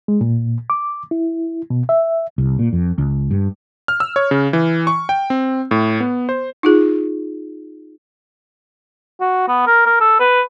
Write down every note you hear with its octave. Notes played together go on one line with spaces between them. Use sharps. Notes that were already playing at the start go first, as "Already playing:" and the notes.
G#3
A#2
D6
E4
B2
E5
C2
A#2
F2
C#2
G2
F6
E6
C#5
C#3
E3
C#6
G5
C4
A2
B3
C5
D#4 F4 G#4
F#4
B3
A#4
A#4
A4
B4